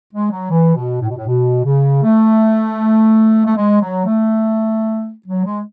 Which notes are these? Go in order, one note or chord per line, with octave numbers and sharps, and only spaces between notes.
G#3
F#3
E3
B2
A2
B2
A2
B2
C#3
A3
A3
G#3
F#3
A3
F#3
G#3